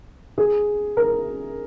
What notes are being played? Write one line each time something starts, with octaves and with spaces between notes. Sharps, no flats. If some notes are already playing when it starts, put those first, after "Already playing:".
G#4
A#4